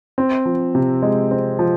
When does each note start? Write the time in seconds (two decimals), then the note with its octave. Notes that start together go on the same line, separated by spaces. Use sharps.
0.18 C4
0.45 F3
0.75 C3
1.02 G#3
1.31 C4
1.59 F3